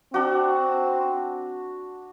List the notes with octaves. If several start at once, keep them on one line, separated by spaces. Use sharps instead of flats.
C4 D4 F#4